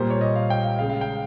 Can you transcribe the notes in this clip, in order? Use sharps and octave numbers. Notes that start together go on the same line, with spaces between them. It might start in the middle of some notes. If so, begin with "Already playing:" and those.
Already playing: A#2 G3 A#3 C5
C#5
D#5
F5
G5
F5
C#3 G#3 F5
F5
G5